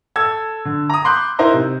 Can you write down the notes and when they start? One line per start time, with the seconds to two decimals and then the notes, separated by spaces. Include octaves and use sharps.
0.16 A4 E6 G#6
0.65 D3
0.90 A#5 D#6
1.04 B5 C6 D6 F#6 G6
1.39 D#4 E4 A#4 C5 D#5 A#5
1.53 C3